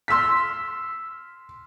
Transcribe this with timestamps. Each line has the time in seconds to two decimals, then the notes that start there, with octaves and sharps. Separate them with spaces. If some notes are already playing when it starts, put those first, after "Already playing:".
0.08 C6 E6 F6 B6